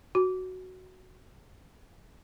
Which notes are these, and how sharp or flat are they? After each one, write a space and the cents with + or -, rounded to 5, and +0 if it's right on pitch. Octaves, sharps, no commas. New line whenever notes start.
F#4 +5